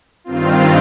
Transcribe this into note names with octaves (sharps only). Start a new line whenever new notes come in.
G2 D#3 C4 F4